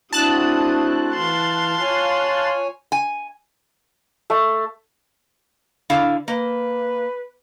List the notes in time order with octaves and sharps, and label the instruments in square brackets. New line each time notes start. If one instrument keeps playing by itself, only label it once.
[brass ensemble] A3 C4 F#4 [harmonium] D4 E4 [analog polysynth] A5 F#6 [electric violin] D#6
[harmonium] E3 [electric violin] F5 C6
[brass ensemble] F4 [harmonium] C#5 G#5
[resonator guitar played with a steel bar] G#5
[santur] A3
[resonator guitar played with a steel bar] D3 E4 F5
[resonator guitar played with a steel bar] A#3 [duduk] B4